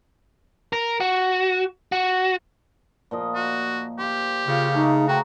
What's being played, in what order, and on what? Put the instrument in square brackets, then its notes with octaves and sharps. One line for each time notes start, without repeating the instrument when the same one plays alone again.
[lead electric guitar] A#4
F#4
F#4
[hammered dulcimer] A#2 F3 D#5
[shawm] F#4
[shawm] G4 [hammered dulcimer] C5 F5
[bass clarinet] C#3 [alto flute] F4 [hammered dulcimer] F5
[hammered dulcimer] A3 G#4 [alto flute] D#4
[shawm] F#4 [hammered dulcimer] C5 C#5 A#5 [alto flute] G5